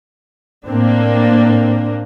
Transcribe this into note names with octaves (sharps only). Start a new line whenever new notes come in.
A2 A#3 C4 D4